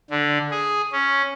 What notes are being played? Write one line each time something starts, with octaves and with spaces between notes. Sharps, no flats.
D3
G#4
C#4